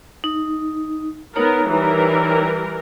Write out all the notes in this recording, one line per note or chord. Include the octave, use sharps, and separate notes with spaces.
D#4
B3 D#4 A#4 C#5 A#5
E3 G3 A#4